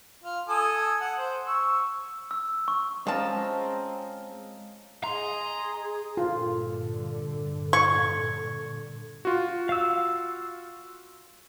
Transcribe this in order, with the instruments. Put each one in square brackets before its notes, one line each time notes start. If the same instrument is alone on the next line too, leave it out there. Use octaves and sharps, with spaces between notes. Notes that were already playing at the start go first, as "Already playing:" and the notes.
[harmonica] F4
A4 G#5 D#6
F#5
C5
C#6 E6
[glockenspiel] E6
C#6
[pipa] F3 A5 [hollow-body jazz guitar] G#3 C#4 [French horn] C4 [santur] D#5 F5 A#5
[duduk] G#4 [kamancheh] D#5 C6 [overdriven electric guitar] A#5
[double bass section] G2 A#2 D3 [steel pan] F4
[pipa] C#6 [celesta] G#6 C#7
[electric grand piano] F4 F#4
[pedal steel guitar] F5 E6